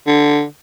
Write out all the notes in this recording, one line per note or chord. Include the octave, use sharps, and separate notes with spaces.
D3